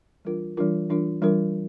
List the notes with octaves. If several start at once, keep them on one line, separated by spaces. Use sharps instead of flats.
E3 G3 D4 F4 A#4
E3 G3 D4 F4 A#4
E3 G3 D4 F4 A#4
E3 G3 D4 F4 A#4